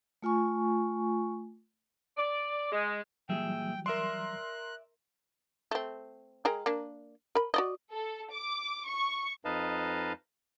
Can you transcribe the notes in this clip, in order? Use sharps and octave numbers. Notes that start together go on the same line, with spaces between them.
A3 F4 G#5 C#6
D5
G#3
A#2 E3 F#3 G3 G#4 E5 G5
A#4 D5 E5 C6 F#6
A3 C4
G#3 A#4 G5
A#3 D4
A#4 B5
F#4 D5 D#5
A4
D6
C#6
F2 D#4 B4 D#5 F5 A5